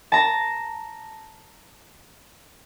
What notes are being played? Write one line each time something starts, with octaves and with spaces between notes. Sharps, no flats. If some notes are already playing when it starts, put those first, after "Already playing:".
A5 A#5